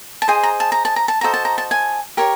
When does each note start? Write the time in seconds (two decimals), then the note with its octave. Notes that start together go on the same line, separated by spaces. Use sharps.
0.22 A5
0.28 G#4 C5 D#5 G#5
0.43 A#5
0.60 A5
0.72 A#5
0.85 A5
0.96 A#5
1.08 A5
1.21 F#4 A4 C5 D#5 A#5
1.34 A5
1.45 A#5
1.58 A5
1.71 G#5
2.17 G4 A#4 C#5